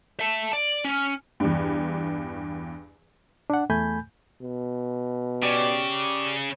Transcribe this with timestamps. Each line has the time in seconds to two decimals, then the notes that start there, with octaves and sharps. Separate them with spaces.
0.20 E5 A5
0.53 D5
0.85 C#4
1.40 E2 G2
3.50 D4 F#5
3.70 E2 A3 G#5 B5 G6
4.41 B2
5.43 C#3 G4 D5